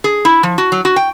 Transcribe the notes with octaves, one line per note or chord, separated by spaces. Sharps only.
G#4
E4
F3
F#4
F#3
F#4
G5